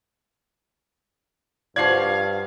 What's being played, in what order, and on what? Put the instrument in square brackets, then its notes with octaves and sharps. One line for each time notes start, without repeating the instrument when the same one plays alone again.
[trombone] G2 [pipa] F3 F#4 D5 [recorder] F5 [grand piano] G#6 C7